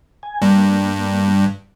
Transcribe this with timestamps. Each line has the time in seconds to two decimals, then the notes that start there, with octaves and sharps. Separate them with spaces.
0.23 G#5
0.42 G2 A#3